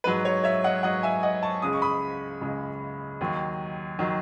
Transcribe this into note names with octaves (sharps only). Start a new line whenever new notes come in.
G#2 F#3 B4
C#5
C#5 E5
D#5 F#5
G#2 F#3 D#5 F#5
E5 G#5
D#5 F#5
A5 C#6
C#2 C#3 G#3 D#6
C#6
B5 D#6
C#2 C#3 G#3
D#2 D#3 F#3
D#3 F#3